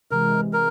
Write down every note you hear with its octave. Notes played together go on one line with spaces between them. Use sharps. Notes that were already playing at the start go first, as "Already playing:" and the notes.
C3 E3 G#3 A#4
A#4